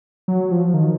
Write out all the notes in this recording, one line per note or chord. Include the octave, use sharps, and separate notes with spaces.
F#3
F3
D#3